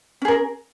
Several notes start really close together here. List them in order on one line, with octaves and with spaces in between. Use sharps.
C#4 G#4 A#4